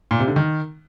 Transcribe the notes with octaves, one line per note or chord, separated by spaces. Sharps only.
A#2
C3
D3
D#3